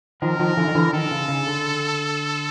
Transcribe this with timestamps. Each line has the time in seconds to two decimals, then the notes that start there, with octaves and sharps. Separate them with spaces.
0.22 D#3 F3 A#4
0.39 D#3 F3
0.57 D3 E3
0.67 D#3
0.75 D3 E3
0.93 D#3 A4
1.11 C#3
1.28 C#3
1.47 D3